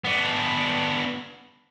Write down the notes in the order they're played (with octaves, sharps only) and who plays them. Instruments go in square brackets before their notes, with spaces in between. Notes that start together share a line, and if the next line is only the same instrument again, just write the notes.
[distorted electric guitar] B3 D4